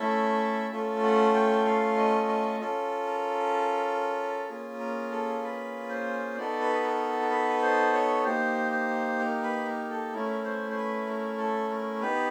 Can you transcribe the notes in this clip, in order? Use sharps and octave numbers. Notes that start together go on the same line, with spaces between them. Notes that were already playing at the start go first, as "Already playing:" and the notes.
Already playing: A3 C#4 E4 A4 E5
A3 C#4 F4 A4
F#5
G5
F5
D#5
D#5
C#4 F4 A4
A#4
A#3 C#4 F4 G#4
A#4
A4
B4
C5
B3 D#4 F#4 A4 D5
B4
A#4
A#4
B4
C5
C#5
A#3 D#4 G4 C5
C5
A#4
B4
A#4
A4
A3 C#4 E4 A#4
C5
C5
B4
A#4
A4
A#4
B3 D#4 G4 B4